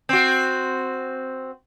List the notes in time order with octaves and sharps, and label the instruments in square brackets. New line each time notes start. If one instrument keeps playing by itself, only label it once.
[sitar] C4 F#4